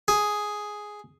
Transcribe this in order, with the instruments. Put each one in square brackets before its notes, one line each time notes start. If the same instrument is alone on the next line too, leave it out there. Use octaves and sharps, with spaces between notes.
[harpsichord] G#4